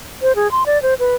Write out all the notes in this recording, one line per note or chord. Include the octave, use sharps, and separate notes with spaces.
C5
G#4
C6
D5
C5
B4